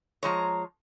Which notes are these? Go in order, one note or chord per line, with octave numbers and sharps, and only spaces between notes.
F3 G#3 C#5 A#5